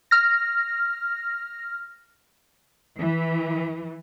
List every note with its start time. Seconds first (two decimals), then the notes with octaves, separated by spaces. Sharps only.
0.11 F6 A#6
2.98 E3